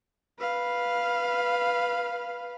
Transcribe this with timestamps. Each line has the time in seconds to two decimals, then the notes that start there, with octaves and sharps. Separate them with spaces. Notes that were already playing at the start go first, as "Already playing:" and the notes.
0.39 B4 F5